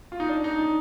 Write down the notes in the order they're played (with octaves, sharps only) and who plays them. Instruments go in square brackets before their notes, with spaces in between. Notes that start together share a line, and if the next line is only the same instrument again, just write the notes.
[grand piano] F4
D#4
D4
D#4
D#4